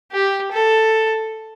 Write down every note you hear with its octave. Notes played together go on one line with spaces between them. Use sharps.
G4
A4